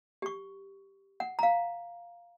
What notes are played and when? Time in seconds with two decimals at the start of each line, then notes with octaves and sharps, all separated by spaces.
0.22 G4 C#6
1.20 F#5
1.39 F5 A#5